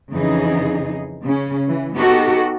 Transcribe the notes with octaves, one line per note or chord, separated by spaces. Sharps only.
F2 C#3 E3 D#4 G#4
C#3 C#4
E3
B3 D#4 F#4 G4 A4